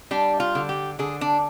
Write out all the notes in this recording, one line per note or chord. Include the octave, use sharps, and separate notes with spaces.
G3 D4
F4
D3
G4
D3 G#4
D4